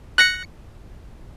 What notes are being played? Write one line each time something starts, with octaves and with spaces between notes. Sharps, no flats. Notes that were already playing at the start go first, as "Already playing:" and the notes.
F#6 A#6 C#7